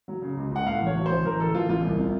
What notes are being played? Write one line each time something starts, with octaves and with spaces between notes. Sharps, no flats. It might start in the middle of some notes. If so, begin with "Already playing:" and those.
F#3
C#3
C#2
C#2 F#5
A2 F5
A1 C#5
F#3
A1 C5
A1 A#4
A1 A4
A1 F4
A1 F4
C2
C3